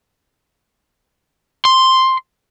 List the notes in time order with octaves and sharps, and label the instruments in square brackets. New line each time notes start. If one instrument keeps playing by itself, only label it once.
[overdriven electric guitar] C6